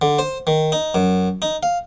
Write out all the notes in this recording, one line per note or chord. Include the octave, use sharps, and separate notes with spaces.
D3
C5
D#3
D#4
F#2
D#4
F5